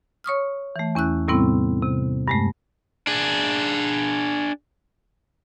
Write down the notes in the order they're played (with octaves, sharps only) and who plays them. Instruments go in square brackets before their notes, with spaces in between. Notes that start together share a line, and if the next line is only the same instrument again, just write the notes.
[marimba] C#5 C#6 D#6 F6
E3 A3
E2 C#4 E4 F#6
A2 C3 G3 B3 C4 E4
C3
G2 G#3 A3
[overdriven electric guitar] D4 G#4